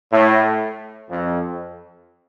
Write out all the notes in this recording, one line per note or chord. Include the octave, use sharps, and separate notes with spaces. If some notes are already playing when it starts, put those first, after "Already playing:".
A2
F2